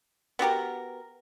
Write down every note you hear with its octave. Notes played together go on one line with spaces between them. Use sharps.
B3 F#4 G4 A#4